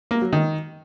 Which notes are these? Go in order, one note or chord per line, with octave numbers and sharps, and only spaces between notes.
A#3
F#3
D#3